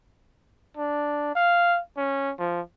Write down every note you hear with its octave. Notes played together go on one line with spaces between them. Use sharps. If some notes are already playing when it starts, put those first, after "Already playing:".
D4
F5
C#4
F3